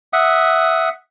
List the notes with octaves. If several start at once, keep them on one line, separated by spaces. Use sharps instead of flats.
E5 F#5 D#6